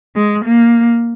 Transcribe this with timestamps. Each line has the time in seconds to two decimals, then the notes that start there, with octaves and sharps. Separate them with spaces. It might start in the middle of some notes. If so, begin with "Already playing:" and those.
0.16 G#3
0.45 A#3